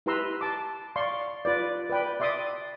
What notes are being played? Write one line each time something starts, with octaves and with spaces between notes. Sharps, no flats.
E4 G4 B4 A#5 C6 E6
A5 D6
D5 F5 C6 C#6
F4 B4 D5
B4 D5 G5 B5
D5 E5 C6 D6 D#6